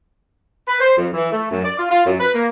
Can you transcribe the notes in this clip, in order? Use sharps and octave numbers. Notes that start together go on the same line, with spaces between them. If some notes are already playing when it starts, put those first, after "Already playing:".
B4
C5
F2
E3
A3
F#2
D5
F4
F4
F#2
B4
A#3